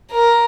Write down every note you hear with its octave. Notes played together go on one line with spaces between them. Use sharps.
A#4